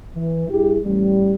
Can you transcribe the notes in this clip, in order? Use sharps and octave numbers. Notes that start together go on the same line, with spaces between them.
E3
G2 G3 E4 G4 G#4
A1 G3